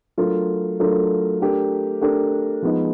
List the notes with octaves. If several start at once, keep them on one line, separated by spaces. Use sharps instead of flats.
F#3 A3 D4 F4 A#4
F#3 A3 D4 F4 A#4
A3 D4 G4 A#4
A3 D4 G4 A#4
F3 G#3 B3 D#4